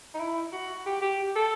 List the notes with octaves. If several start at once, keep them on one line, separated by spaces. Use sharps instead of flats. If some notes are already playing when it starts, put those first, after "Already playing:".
D#4
E4
F#4
G4
G4
A4